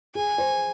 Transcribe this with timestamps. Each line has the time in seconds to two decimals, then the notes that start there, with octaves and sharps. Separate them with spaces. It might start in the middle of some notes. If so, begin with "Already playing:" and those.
0.15 G#4 G#5
0.38 C5